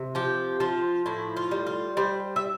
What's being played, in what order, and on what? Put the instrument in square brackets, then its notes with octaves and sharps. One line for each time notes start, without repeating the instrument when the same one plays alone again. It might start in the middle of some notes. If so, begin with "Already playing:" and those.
Already playing: [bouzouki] C3
F3 G4
F3 F4
A2 E4
F4
G3
F4
G3 C5
E5